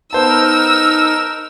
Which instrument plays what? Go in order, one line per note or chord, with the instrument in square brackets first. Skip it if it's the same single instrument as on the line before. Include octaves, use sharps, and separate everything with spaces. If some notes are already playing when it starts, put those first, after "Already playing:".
[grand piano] B3 C5 A5 [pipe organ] D#4 A#4 [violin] E6